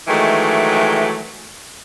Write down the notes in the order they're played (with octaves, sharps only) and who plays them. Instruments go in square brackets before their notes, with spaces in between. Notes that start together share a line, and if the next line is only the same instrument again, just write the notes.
[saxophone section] D#3 E3 F#3 G#3 A3